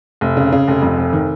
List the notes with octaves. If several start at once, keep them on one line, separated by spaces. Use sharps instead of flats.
F1
C#3
C#3
F1
F2
F1
D#3